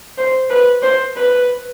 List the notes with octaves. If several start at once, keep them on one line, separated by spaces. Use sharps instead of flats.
C5
B4
C5
B4